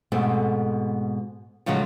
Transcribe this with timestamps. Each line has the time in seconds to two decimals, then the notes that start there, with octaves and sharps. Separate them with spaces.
0.12 G#2 B2 G#3 A3 C4
1.66 A2 C#3 F3 F#3 G#3